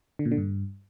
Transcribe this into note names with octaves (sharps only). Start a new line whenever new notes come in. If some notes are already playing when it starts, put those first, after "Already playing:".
D3
A#2
D3
G2